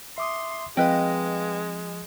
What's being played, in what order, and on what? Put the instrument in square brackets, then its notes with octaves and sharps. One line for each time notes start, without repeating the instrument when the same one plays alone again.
[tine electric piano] E5 D6 D#6 [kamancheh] C6
[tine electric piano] F3 [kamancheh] G#3 [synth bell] C4 F5 [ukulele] B4 D#5 G5